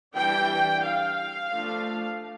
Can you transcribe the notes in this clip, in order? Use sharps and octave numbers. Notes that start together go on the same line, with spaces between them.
E3 G3 D4 G5
F5
F3 A3 D4